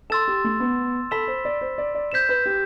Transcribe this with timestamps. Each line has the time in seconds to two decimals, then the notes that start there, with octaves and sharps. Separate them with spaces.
0.10 A4 C6 E6 A6 E7
0.28 G4
0.44 A3
0.60 B3
1.11 A4 B5 E6 B6 E7 G7
1.27 C5
1.45 D5
1.61 C5
1.78 D5
1.95 D5
2.12 C5 G6 B6 E7
2.29 B4
2.46 G4